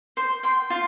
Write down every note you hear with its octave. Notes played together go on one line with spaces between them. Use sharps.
C5
G5 C6
F4